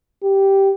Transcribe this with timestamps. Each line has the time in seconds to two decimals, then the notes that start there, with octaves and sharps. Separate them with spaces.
0.23 G4